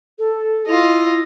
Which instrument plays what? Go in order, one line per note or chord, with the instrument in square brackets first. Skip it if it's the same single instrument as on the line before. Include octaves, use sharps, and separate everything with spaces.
[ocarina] A4
[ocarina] E4 [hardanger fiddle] F4 D#5